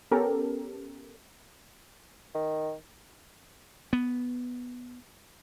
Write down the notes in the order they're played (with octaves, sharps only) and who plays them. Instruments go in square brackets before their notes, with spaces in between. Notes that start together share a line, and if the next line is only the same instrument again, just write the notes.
[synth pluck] B3 C#4 G4 A4 A#4
[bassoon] D#3
[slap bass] B3